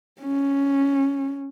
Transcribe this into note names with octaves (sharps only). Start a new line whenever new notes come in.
C#4